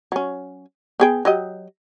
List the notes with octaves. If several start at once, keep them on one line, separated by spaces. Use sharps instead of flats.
F#3 C#4
B3 G#4 G5
F#3 G4 D#5